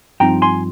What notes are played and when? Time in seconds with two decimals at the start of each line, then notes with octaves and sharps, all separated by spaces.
0.20 G2 F3 C4 D#4 G5 A#5
0.42 G#5 C6